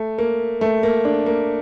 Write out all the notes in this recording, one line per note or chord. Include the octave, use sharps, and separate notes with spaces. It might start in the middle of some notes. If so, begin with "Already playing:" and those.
Already playing: A3
A#3
A3
A#3
D4
A#3